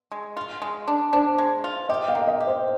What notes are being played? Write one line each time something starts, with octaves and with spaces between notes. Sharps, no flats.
G#3
F4
G#3
D4
D4 C5
G#3
F4
G4 D#5
F5
A#3
D#5
G4
C5